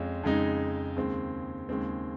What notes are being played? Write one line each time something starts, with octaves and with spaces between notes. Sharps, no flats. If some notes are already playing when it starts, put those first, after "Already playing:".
Already playing: F2 G#3 C#4 F4
F2 C#3 G#3 D#4
D#2 C#3 G#3 C4
D#2 C#3 G#3 C4